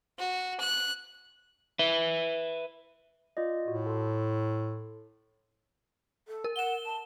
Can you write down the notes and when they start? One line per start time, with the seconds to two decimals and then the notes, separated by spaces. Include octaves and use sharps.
0.19 F#4
0.60 F#6
1.79 B4 E5
3.37 F4 D5 D#5
3.68 A2 F#4
3.86 A4 C6
6.28 A4
6.44 A#4
6.56 F#5 E7 G7
6.86 A5